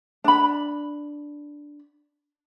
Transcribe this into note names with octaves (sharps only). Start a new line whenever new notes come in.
D4 B5